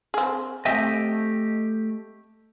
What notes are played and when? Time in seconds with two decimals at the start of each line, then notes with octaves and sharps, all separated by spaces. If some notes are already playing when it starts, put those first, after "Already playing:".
0.14 C4 G#4
0.65 A3 C4 G4 D#5 E5 G#5